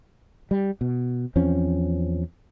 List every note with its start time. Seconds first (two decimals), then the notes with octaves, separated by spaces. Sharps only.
0.51 G3
0.81 B2
1.36 E2 F3 C4 C#4